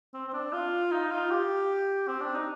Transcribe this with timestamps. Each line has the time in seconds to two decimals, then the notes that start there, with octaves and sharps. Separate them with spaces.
0.14 C4
0.28 C4
0.33 D4
0.53 F4
0.92 D#4
1.11 F4
1.31 G4
2.08 C4
2.22 D4
2.35 D#4